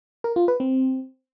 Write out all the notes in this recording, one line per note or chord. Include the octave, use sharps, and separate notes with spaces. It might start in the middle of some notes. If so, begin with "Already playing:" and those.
A#4
F4
B4
C4